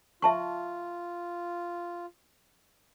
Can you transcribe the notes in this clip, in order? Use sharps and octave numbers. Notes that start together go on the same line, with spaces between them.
F4 E5 A5 C#6